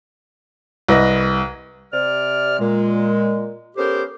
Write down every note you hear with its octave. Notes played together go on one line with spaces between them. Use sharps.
C2 B4 D#5 A#6
C3 D5 F6
A#2 G#3
B3 C#4 G4 A4 A#4 C5